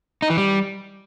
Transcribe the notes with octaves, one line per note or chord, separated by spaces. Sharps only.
D#4
E3
G3